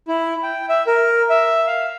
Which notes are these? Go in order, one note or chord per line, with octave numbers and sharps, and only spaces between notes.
E4
G5
E5
A#4
E5
F5